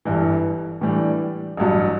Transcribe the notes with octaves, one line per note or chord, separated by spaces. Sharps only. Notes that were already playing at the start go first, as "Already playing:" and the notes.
G1 G2 E3
A2 E3 G3 D4
A1 G2 F#3